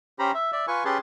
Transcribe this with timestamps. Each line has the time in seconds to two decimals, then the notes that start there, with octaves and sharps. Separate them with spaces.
0.19 C#4 G4 C5 A#5 B5
0.34 E5
0.52 D5 E5
0.68 F4 B4 G#5 C#6
0.85 C#4 G4 G#4 B4 A5 C6